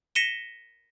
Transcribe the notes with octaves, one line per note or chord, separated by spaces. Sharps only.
A#6 B6 C#7 D#7 E7 G7